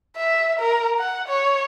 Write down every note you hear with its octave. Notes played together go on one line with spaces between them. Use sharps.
E5
A#4
F#5
C#5